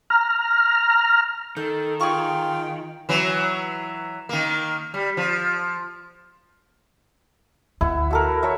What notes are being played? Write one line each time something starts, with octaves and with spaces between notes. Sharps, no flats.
A#5 F6
D#3 A4 G6
F4 G#4 G5 C#6
E3 F#3
D#3 A#3
G3
F3
D2 E4 F#5
F#4 A4 A#4
A4 C#5 E5